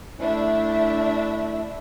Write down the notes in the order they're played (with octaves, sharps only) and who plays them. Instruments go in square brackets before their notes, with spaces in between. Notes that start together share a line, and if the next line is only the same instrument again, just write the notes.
[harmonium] A3 E4 [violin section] D4 E5